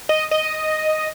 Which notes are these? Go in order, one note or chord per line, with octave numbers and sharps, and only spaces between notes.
D#5
D#5